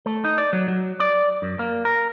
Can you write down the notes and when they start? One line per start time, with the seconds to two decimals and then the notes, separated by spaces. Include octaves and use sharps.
0.06 A3
0.24 D#4
0.38 D5
0.53 F#3
0.68 F#3
1.00 D5
1.42 F#2
1.59 A#3
1.85 A#4